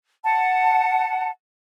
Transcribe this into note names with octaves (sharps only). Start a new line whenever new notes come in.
F#5 A5